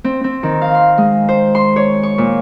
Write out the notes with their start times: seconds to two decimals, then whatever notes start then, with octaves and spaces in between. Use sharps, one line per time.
0.04 C4
0.24 C4
0.43 D#3
0.61 F5
0.75 C6
0.98 G#3
1.28 C5
1.55 C6
1.76 C#5
2.03 C#6
2.18 A#2